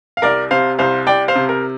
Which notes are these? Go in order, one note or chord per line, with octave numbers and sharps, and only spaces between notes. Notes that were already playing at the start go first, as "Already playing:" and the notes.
F5
C2 A#4 D5
C3 C5 F5
C2 C5 F5
C2 D5 G5
C5 F5
C3
A#4